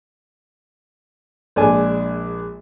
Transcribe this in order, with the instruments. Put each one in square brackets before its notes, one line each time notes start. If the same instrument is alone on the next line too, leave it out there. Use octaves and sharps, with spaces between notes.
[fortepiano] A#1 G#3 D4 G#5